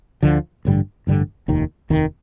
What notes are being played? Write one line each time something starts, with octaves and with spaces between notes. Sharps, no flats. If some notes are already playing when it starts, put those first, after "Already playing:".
D2 D3 F3
A1 G2 D3 G3
A1 G2 D3 G3
F1 D#2 D#3
F1 D#2 D#3